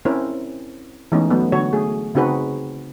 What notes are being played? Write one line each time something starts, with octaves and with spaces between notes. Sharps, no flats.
C4 C#4 E4 A#4 C5
E3 G#3 A3 B3 C#4 D#4
F#3 A3 B3
D3 F#4 C#5
A3 G#4
C#3 C4 D#4 F#4 G#4 B4